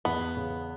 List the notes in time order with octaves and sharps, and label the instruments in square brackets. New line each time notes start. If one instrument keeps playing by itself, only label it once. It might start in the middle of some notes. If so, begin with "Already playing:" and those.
[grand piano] E2 [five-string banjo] B3
[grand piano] C#3